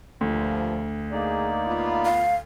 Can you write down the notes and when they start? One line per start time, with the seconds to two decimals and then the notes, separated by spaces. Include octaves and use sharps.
0.21 D2 G2 A#2 F3
1.12 A#3 D#4 G#4 D5
1.67 B3 F4
2.05 F5